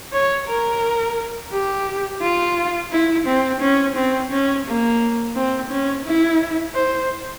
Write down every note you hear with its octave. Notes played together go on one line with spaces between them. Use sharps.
C#5
A#4
G4
F4
E4
C4
C#4
C4
C#4
A#3
C4
C#4
E4
C5